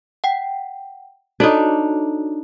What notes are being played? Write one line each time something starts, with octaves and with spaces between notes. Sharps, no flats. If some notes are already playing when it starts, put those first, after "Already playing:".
F#5 G5
D4 D#4 F#4 A4 C#5